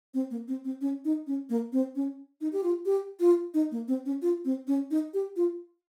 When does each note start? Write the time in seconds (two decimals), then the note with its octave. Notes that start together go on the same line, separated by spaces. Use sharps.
0.14 C4
0.31 A#3
0.48 C4
0.65 C4
0.81 C#4
1.05 D#4
1.27 C#4
1.50 A#3
1.72 C4
1.95 C#4
2.41 D#4
2.53 G4
2.63 F4
2.85 G4
3.20 F4
3.54 D#4
3.71 A#3
3.88 C4
4.06 C#4
4.22 F4
4.45 C4
4.67 C#4
4.91 D#4
5.14 G4
5.36 F4